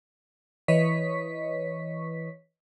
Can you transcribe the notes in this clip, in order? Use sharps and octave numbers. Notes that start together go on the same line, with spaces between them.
E3 B4 C#5 D#5 C#6 B6